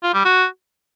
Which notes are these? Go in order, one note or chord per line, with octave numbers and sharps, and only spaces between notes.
F4
G3
F#4